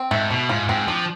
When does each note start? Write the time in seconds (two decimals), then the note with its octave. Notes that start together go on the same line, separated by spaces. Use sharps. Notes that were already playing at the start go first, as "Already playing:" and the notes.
Already playing: C4
0.11 G#2 A3
0.30 B2 A3
0.49 G#2 F4
0.68 G#2 C4
0.87 F3 D4